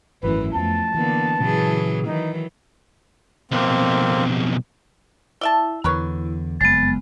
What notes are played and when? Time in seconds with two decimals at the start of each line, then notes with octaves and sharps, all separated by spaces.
0.23 G#1 F#2 C3 E3 A3 E4 B4
0.54 F2 F3 A3 B3 A5
0.94 D3 E3 A#3 B3
1.40 A#2 C#3 E3 F#3 C#4 G#4
2.07 D#3 E3 F#3 D#4
3.51 B1 F2 A#3 C4
5.41 E4 D5 E5 A5
5.84 E2 D3 A#4 B4 C#5
6.61 F#1 F2 G#3 B3 A6